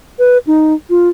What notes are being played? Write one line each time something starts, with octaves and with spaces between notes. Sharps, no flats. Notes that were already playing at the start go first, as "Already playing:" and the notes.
B4
D#4
F4